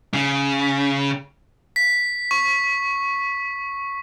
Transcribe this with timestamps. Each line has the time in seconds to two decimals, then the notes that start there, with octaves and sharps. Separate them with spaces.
0.14 C#3
1.76 B6
2.31 C#6